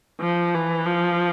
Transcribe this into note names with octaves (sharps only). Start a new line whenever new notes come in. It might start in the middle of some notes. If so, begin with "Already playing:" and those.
F3
E3
F3